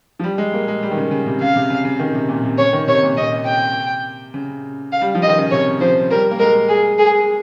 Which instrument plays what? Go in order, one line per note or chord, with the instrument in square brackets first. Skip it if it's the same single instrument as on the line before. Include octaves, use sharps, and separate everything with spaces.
[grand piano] F3
G3
G#3
A#3
G#3
G3
D#3
C#3
C#3
C3
[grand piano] C#3 [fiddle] F5
[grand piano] C3
C#3
C#3
D#3
C3
A#2
C3
[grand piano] C#3 [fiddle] C#5
[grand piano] D#3
[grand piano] C3 [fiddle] C#5
[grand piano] A#2
[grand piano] C3 [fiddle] D#5
[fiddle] G5
[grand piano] C#3
[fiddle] F5
[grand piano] G3
F3
[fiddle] D#5
[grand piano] D#3
C#3
[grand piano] C3 [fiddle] C#5
[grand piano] F3 [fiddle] C5
[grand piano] G3 [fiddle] A#4
[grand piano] A#3
[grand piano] G#3 [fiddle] A#4
[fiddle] G#4
G#4